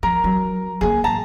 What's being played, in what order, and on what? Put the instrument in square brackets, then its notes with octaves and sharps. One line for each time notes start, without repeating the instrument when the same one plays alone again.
[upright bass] F3 [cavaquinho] A#4
[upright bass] F#3
[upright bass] D3 A#3 [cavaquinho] G#4
[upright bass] A1 [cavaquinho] A5 A#5